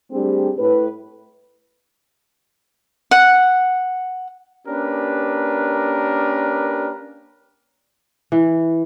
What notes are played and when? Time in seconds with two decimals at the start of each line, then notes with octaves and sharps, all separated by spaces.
0.11 G3 A3 C4 D4 G4 G#4
0.58 A2 B4
3.11 F#5
4.68 A#3 C#4 D4 G4 A#4 B4
8.32 E3